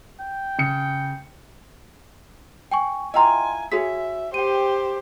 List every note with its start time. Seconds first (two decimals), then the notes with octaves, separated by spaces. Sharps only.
0.20 G5
0.58 C#3 C#7
2.71 G5 G#5 C#6
3.14 E4 F4 D#5 G5 G#5 A#5 C6
3.72 F#4 G#4 C#5 E5 G#5 B6
4.34 G4 C5 G5 D#7